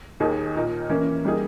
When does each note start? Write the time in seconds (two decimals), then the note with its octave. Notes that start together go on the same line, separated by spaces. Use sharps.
0.20 D#2 D#3 A#3 D#4 G#4
0.55 A#2 A#3 D#4 A#4
0.89 E3 A#3 C#4
1.25 G3 A#3 D#4 G#4